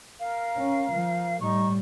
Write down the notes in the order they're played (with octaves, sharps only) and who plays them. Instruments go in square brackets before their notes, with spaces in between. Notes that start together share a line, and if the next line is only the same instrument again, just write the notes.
[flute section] A#4 F5
[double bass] C#4
F3
[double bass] A2 G3 [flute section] D#4 C#6